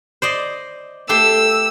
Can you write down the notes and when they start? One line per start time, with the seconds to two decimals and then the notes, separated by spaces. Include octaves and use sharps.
0.22 C5 D5 D#5
1.09 A3 G4 C6 E6